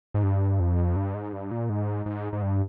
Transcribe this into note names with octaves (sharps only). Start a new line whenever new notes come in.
G#2
G2
F2
G2
G#2
G2
A#2
G#2
G#2
G#2
G2